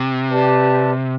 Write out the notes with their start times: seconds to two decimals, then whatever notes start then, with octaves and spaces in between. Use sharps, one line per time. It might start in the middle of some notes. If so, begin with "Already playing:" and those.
Already playing: C3
0.29 G4 B4 D5 A5